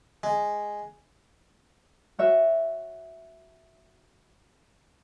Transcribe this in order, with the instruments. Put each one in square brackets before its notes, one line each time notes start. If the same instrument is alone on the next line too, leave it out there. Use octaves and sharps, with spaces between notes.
[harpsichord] G#3
[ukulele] F#4 C#5 E5